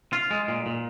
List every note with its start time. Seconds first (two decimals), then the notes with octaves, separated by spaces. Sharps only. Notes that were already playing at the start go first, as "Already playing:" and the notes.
0.13 F4
0.31 G#3
0.48 A#2
0.66 A#2